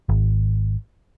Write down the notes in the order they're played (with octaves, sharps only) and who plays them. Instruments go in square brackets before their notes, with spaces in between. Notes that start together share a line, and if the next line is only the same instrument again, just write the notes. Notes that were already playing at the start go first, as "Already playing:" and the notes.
[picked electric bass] G#1